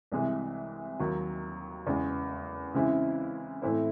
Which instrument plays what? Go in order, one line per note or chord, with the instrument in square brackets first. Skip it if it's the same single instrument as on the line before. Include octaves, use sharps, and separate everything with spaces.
[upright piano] C2 C3 E3 G#3
D#2 D#3 F#3
E2 C#3 G#3
C#3 E3 G#3 C4 E4
A2 E3 C4 E4 C5